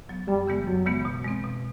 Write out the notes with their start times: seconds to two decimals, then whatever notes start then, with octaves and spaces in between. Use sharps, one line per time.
0.09 F#3 B3
0.28 F#2 G3
0.47 C#3 E3 G#3 B3
0.67 F#2 F#3
0.86 C#3 E3 G#3 B3
1.05 B2
1.24 G#3 C4
1.44 B2